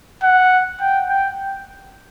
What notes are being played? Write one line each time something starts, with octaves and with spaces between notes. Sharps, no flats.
F#5
G5
G5